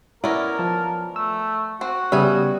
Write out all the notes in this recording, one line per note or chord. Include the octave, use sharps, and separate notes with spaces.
B3 C#4 E4 A#4 D5 A#5
F3 A5
A3 E6
C4 F#4
C#3 G3 B3 E5 G#5 D#6